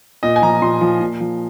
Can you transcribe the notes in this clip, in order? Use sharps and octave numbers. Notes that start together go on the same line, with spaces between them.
A#2 D#5
G#5
F3 A#5
A#2 C6
F3
A#2
F3